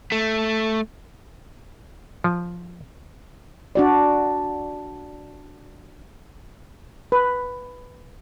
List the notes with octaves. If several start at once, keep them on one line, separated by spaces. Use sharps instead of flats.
A3
F3
D4 F#4 D5
B4